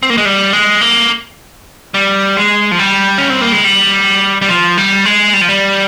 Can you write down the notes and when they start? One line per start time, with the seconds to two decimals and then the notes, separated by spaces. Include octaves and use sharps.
0.03 C4
0.10 A#3
0.18 G#3
0.25 G3
0.53 G#3
0.81 A#3
1.94 G3
2.37 G#3
2.71 F3
2.79 G3
3.18 C#4
3.30 C4
3.41 A#3
3.52 G#3
3.64 G3
4.42 G3
4.49 F3
4.78 G3
5.05 G#3
5.34 G3
5.41 F3
5.49 G3